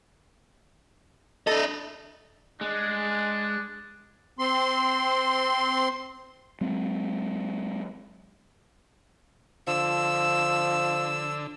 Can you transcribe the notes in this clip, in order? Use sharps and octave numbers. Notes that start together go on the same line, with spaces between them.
D4 A4 D#5
G#3 D4
C4 C6
F#3 G#3 C4
D3 F3 E6